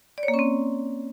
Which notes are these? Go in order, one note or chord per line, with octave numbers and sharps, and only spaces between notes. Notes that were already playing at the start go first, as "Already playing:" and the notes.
D5
C#5
A#3
C#4
C4